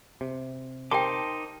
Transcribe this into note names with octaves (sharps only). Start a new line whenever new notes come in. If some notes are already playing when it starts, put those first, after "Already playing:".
C3
D#4 G4 A#4 C5 G5 A5 C6 D6